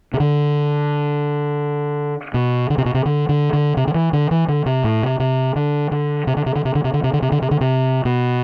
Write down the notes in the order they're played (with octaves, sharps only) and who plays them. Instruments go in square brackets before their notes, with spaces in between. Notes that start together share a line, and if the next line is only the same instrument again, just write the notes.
[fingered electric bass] C3
D3
B2
D3
C3
B2
C3
D3
D3
D3
C3
D3
E3
D3
E3
D3
C3
A2
C3
C3
D3
D3
C3
D3
C3
D3
C3
D3
C3
D3
C3
D3
C3
D3
C3
D3
C3
B2